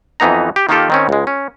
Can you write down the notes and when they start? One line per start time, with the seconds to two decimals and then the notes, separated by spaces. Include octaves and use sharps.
0.20 F2 E3 B3 D#4 A#5
0.56 G4
0.69 D#3 A#3 D#4 F4 G4 A4
0.90 D#3 C4 C#4
1.09 C#2 G#3
1.27 C#4